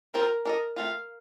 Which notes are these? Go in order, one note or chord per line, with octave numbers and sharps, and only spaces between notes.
F3 C4 F4 A#4 C5
D4 A4 A#4 D#5
A3 C4 F4 F5